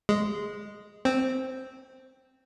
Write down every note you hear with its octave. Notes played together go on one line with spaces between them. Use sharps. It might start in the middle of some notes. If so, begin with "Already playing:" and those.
G#3
C4